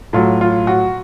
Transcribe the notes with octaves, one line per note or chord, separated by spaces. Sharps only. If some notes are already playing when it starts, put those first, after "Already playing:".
A2 F#3 F4
F4
F#4